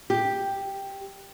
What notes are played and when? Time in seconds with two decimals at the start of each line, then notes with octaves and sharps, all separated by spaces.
0.10 G4